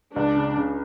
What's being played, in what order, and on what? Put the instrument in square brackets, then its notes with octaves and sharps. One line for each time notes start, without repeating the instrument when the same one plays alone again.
[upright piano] C#2 [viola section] D4
[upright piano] C#3
C#3